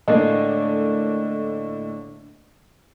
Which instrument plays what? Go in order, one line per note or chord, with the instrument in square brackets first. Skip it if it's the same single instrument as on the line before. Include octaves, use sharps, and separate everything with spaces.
[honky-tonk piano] A2 A#3 [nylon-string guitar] D3 G#3 D4 [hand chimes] D#5